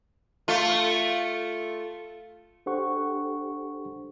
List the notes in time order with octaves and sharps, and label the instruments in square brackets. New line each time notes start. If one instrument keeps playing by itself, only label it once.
[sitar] A3 F4
[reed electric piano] D4 G4 A4 C5 F#5 C#6